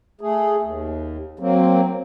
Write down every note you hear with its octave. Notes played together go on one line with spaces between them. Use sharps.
A3 G#4
D#2
F#3 A#3 C4